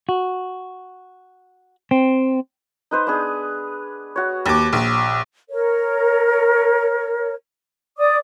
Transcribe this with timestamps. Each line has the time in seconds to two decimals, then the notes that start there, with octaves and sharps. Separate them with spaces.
0.09 F#4
1.91 C4
2.91 D#4 B4 C5
3.07 B3 D4 G#4
4.16 F#4 C#5
4.46 D#2 D6
4.73 A#1
5.49 A#4 C#5
7.97 D5 D6 D#6